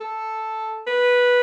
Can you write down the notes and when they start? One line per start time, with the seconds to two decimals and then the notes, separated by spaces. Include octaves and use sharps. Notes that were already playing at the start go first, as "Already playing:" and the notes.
0.01 A4
0.87 B4